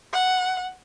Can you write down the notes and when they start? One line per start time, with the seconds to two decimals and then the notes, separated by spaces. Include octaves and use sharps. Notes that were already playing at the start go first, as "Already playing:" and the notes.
0.13 F#5